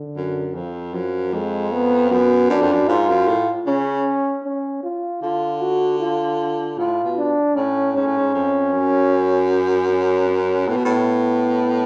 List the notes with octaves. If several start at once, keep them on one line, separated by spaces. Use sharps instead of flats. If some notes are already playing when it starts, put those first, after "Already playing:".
Already playing: D3
F#2
F2 F3
F#2 F3
F2 G#3
B3
F#2 B3
F#2 D4
F2
F#2
G#2 F4
F#2
A2
C#3 C#4
C#4
F4
D3 F4
F#4
F4
A2 F4
B2
D4
A2 C#4
G#2 C#4
A2
G#2
F2
F#2
C#4
C#4
A2 B3
B2
A2